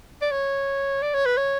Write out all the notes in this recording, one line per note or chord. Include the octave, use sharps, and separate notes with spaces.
D5
C#5
D5
C#5
B4
C#5